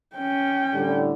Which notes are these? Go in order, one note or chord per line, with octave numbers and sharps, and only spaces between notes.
C#4 G5
A2 D3 G3